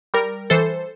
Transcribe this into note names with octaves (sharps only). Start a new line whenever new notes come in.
G3 A#4
E3 A4 C5